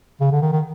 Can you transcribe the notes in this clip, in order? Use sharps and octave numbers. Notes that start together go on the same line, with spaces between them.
C#3
D3
D#3
D#3